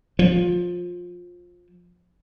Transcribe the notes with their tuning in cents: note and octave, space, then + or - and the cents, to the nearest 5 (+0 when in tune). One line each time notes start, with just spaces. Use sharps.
F3 +15